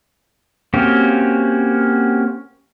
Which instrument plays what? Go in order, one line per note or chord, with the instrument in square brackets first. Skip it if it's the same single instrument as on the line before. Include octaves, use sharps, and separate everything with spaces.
[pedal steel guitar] A#3 C4 C#4 F#4 G4